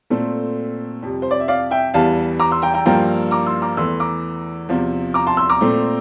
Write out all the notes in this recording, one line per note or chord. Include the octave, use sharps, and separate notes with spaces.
A#2 A3 C4 A4
F2 C3 G3
C5
D5
E5
D5 F5
E5 G5
E2 E3 G3 F5 A5
A#5 D6
C6 E6
G5 A#5
G5 A#5
G2 F3 A#3 G5 A#5
A#5 D6
C6 E6
A#5 D6
E2 E3 A3 C6 E6
A#5 D6
E2 C3 F3
A#5 D6
A5 C6
C6 E6
A#5 D6
A#2 A3 C4